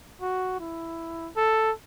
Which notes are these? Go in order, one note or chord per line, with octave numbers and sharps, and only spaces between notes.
F#4
E4
A4